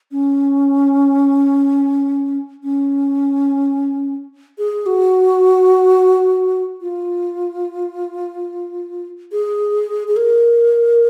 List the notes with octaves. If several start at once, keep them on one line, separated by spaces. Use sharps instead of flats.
C#4
C#4
G#4
F#4
F4
G#4
G#4
A#4